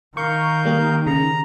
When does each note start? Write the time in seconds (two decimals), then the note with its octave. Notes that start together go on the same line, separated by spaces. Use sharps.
0.17 D#3 A#4 F5 C#6 G6
0.65 G3 A#3 G4
1.07 C#3 A#5